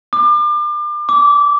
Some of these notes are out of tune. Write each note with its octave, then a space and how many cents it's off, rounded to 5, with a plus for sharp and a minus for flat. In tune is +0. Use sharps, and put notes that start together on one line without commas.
D6 +35
D6 -20